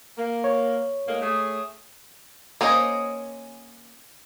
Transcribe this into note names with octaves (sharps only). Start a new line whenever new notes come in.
A#3
C#5
A2 G#3 A#3
A3 G#4
A#3 C#4 G#4 C5 D#5